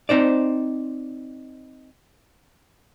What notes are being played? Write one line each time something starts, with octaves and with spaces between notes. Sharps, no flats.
C4 D#4 C5 D5